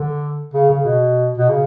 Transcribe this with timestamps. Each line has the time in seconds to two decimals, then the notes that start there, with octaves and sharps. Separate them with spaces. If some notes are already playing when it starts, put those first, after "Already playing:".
Already playing: D3
0.54 C#3
0.70 C#3
0.85 B2
1.38 B2
1.49 C#3